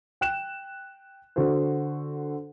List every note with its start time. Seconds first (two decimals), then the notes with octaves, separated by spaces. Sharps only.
0.21 G5 F#6 E7
1.36 D3 F#4 A4 C5